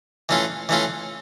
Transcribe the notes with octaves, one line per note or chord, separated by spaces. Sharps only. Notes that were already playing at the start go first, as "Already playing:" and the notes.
E3 A3 C#4 F4
E3 A3 C#4 F4